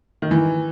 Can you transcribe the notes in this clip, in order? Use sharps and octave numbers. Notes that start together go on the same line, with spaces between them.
D#3
E3